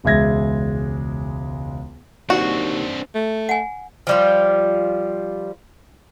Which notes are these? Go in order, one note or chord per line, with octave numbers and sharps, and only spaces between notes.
E1 C#2 G#3 E5 G#6 A#6
D#2 C4 D4 F#4
A3
F#5 G#5
F3 G3 F4